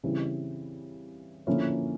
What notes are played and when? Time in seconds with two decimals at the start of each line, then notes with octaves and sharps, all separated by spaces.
0.04 C#3 E3 G3 C4 E4
1.47 D3 F3 A#3 C#4 E4